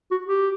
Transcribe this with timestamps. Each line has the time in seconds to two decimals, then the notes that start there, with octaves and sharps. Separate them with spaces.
0.11 F#4
0.27 G4